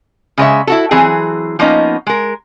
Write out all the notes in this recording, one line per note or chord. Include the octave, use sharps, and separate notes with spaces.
C#3 G#3 C#5 E5
E4 F#4 A4
E3 F#3 C4 G#4
F3 A#3 B3 C#4 D#4
G#3 A#4